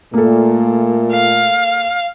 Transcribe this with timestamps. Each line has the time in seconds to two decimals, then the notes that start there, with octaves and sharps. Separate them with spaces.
0.13 A#2 A3 A#3 A4
1.12 F5